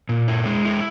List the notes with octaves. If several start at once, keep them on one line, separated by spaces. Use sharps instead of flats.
A#2
E4
G#3
E4